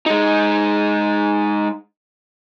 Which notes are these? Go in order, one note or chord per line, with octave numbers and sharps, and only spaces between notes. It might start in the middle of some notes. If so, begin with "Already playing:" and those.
G#3 D#4